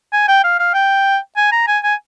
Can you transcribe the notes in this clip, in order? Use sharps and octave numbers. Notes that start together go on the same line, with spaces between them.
G#5
G5
F5
F5
G5
G#5
A#5
G#5
G#5